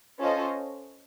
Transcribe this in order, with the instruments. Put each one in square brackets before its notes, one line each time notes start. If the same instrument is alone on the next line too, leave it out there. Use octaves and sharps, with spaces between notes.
[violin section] C#4 F4 A4 C5 D#5